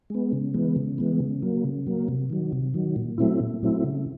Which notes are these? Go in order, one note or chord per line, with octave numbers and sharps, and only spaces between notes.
G#3 B3
C#3
E3 G#3 B3
C#3
E3 G#3 B3
C#3
F#3 A#3
C#3
F#3 A#3
C3
D#3 F#3
C3
D#3 F#3
A#2
F#3 A3 C4 E4
A#2
F#3 A3 C4 E4
C#3